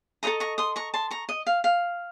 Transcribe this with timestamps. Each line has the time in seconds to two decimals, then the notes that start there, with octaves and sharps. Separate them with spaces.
0.23 A4 C5 D#5 A#5 C#6
0.40 A#5 C#6
0.58 C6 D#6
0.76 A#5 C#6
0.94 A5 C6
1.11 A#5 C#6
1.29 D#5
1.47 F5
1.64 F5